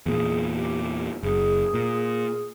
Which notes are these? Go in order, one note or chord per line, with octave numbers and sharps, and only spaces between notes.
E2 A#2 G#4
G4
F#1 G#4
A#2